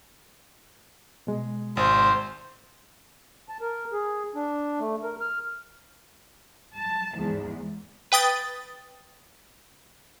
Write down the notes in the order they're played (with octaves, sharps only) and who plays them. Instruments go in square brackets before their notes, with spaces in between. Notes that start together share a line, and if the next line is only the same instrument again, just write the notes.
[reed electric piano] B2 G#3
[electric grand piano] G#1 [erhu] C5
[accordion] A5
A#4
G#4
D4
A3
A#4
F6
[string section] A5
E2 G#2
[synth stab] B4 G5 D#6 A6